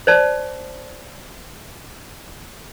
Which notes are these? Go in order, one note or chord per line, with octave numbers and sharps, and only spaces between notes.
C5 D5 A5